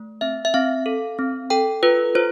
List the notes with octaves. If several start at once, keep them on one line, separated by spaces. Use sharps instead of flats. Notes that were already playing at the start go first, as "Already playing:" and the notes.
Already playing: A3
C4 E5
E5
C4 F5
A4
C4
A4 G5
F4 B4
F4 C5